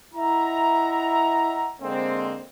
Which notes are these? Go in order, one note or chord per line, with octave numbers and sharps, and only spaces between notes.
E4 D#5 E5 F#5 A#5
D3 G#3 A#3 C4